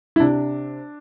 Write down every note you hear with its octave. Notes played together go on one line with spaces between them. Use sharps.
E4
C3 D4